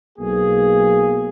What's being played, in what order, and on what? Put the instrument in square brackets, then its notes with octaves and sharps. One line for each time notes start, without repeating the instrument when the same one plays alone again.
[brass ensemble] B1 A#3 G#4